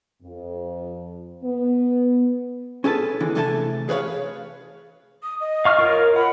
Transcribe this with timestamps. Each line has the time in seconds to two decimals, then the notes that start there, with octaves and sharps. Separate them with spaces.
0.22 F2
1.43 B3
2.84 C#4 G#4 A4 B4 A5
3.20 D#2 D3 E3
3.35 C3 E3 A3 A4 G#5 A5
3.89 G#4 B4 C#5 F5
5.23 D#6
5.41 D#5
5.65 F5 C#6 F6
5.79 F4 A#4 C#5
6.16 F#5 B5